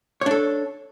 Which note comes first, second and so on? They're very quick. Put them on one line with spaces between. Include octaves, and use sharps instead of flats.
C#5 D4 A4